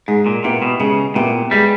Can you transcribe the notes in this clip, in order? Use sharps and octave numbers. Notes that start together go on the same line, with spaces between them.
G#2 G#3
A#2
A#2 B3 E4 G4
B2
C#3 G#3
A#2 B3 E4 G4
G3 G#3